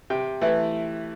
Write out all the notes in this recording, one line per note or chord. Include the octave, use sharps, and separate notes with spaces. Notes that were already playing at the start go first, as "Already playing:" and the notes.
C3 G5
E3 A3 E4